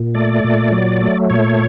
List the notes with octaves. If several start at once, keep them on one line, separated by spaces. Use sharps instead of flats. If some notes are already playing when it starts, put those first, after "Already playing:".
Already playing: A#2
A3 D5
A#2
F#3
A3
A#2 C#5